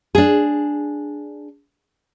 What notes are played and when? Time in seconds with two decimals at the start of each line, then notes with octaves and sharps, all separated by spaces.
0.15 D4 G#4